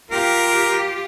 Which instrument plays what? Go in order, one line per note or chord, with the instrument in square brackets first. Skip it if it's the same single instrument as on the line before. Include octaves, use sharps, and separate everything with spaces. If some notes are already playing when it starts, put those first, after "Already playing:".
[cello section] F4 G4 [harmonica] A#4